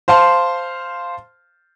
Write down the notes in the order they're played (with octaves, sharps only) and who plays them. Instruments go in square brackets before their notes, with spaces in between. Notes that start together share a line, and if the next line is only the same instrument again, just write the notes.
[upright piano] C5 F5 A5 C6